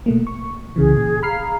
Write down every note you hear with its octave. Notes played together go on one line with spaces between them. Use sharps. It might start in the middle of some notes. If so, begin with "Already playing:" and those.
B2 A3 A#3
C#6
C2 C#3 E3 G#4
A#2
G#4 F5 A#5 B5 F6 C7